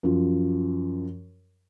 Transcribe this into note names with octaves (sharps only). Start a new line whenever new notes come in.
F#2 F3